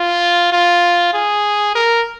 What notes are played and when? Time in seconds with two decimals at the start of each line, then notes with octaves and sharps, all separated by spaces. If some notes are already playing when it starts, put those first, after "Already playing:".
Already playing: F4
0.53 F4
1.13 G#4
1.75 A#4